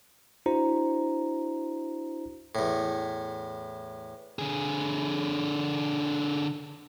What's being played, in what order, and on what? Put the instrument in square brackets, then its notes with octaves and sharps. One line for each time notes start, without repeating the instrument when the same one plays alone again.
[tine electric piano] D4 E4 F#4 C5 A#5
[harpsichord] E2 A2
[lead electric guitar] D3 G#4